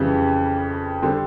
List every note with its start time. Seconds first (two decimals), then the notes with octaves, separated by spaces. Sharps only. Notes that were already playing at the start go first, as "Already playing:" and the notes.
Already playing: F2 C#3 E3 G3
1.02 D3 G3 C4